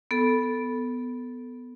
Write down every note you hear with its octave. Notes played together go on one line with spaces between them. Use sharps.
B3 A4